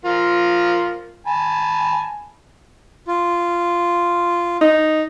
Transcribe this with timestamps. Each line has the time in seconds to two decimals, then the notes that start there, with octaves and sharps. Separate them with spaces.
0.05 F3 F4 A#4
1.27 G#5 A5 B5
3.07 F4
4.61 D#4